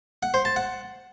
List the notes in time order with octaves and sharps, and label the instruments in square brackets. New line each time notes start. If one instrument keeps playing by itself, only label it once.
[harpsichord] F#5
C5
A5
F#5